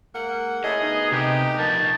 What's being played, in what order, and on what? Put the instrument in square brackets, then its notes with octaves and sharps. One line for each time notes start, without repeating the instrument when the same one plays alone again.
[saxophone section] G#2 A#3 F#5
[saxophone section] A3 C#4 E4 [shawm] G#4 [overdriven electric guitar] D#5
[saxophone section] D2 B3 D#4
[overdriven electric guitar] C3 [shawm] G4
[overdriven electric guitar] F3 A#4 [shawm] A5